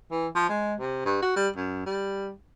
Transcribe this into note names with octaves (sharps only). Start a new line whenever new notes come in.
E3
F3
G#3
C3
G2
F#4
G3
F#2
G3